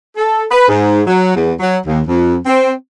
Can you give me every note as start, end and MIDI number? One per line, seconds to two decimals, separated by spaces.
0.17 0.45 69
0.51 0.68 71
0.68 1.01 44
1.07 1.34 54
1.35 1.52 40
1.60 1.77 54
1.86 2.00 39
2.07 2.37 41
2.46 2.71 60